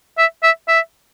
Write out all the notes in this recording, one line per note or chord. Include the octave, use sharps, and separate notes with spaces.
E5
E5
E5